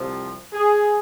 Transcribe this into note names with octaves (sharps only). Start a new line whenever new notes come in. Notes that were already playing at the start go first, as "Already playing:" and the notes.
Already playing: C2 C3 F3
G#4